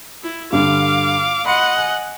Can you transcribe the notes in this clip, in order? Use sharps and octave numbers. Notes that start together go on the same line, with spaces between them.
E4
G2 D3 F5 D6
D#5 F#5 B5 C6 C#7
G#5